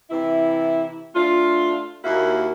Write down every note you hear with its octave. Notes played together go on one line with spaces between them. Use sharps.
C3 E3 E4
A3 D4 F4
D#2 A#3 E4 F#4